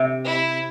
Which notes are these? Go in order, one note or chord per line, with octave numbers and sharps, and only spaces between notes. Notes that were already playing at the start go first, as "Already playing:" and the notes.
Already playing: C3
E4